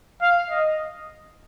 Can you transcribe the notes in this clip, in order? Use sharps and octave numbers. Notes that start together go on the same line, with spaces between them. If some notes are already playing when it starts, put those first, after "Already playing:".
F5
D#5